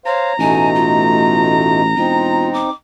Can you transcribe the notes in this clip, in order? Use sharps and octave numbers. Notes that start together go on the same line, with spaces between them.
C5 C#5 F5 A#5
A1 B2 A3 D#4 G#5
F4
E1 C4 D#4 F4
D6